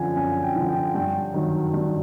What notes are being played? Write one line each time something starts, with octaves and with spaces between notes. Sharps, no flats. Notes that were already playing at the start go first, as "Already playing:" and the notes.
Already playing: F#2 D3 F3 G#5
F#2 G#5
G5
D3 F3
G5
G2 G5
D#3 F#3
G2